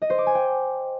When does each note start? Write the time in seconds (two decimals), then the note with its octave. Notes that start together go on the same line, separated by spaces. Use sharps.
0.02 D#5
0.10 C5
0.18 D6
0.27 G#5
0.35 G5